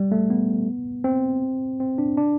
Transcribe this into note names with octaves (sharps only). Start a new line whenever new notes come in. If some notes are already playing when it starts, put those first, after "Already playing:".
Already playing: G3
A3
B3
C4
C4
D4
D4